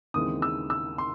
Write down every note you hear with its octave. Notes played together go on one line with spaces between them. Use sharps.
D#2 C#3 E3 G#3 C4 D#6
E6
E6
C6